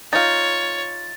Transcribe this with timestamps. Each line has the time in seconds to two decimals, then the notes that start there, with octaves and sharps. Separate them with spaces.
0.13 D#4 F4 C#5 A6